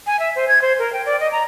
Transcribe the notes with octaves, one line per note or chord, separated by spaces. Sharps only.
G#5
E5
C5
G#6
C5
A#4
G5
D5
D#5
A#5